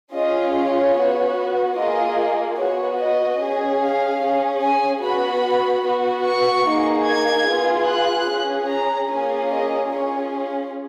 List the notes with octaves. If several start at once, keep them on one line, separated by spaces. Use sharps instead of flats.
C#4 F4 G#4 D#5
C#5
B3 F#4
A#3 F4 G#4 D#5
B3 F#4 C#5
D#5
C#4 G#4
F5
C#4 G#4
G#5
B3 F#4 B5
B3 F#4
C#6
A#3 D#4 G#4
G#6
B3 F4 G#4
F#6
C#4 G#4
A#5
A#3 C#4 F4 G#4 G#5
D#5
C#4 F4 G#4 C#5